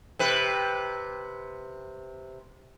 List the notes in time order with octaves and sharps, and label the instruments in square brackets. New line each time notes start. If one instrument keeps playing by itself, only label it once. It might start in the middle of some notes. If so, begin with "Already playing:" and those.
[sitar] C3 B4